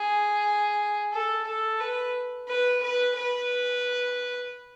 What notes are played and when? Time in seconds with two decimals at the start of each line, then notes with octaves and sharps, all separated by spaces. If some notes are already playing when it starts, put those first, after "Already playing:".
Already playing: G#4
1.12 A4
1.47 A4
1.80 B4
2.48 B4
2.83 B4
3.16 B4